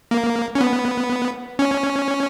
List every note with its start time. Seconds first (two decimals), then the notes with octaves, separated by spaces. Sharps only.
0.11 A#3
0.55 C#4
0.61 B3
1.59 C#4